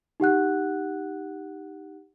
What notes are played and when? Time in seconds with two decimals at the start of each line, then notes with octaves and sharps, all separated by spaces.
0.20 D#4 G4 F#5 F#6